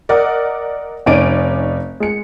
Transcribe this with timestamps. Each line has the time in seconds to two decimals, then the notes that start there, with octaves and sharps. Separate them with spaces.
0.09 A#4 D5 D#5 F#5
1.06 F1 C#4 D#4 D5 D7 D#7
2.00 G#3 C#7